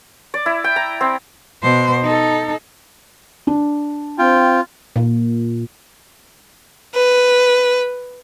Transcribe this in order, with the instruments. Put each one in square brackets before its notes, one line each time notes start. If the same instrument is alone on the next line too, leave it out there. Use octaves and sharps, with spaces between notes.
[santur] D5
E4
G5
A#5
C4
[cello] B2 C5
D#4 A4
[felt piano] D4
[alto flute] C4 [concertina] F4 [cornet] G5
[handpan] A#2
[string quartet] B4